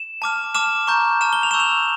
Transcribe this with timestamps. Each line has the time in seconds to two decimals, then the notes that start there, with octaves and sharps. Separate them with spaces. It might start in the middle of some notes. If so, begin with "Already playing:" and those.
Already playing: E7
0.22 A5 D6 F6
0.54 A5 D6 F6 E7
0.87 A#5 C#6 G6
1.21 A5 C#6 F6 E7
1.33 G7
1.43 F7
1.51 A5 C#6 E6 G6 E7
1.60 F7